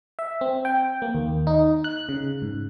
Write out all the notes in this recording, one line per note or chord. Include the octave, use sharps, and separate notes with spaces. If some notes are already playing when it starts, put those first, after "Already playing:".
E5
C4
G5
A#3
D#2
D#4
F#6
C#3
G#2